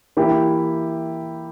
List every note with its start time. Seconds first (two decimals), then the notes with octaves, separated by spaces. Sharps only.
0.17 E3 A#3 E4 G4